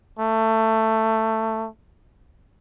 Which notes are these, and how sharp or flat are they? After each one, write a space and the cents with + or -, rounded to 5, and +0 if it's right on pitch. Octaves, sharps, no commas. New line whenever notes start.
A3 +15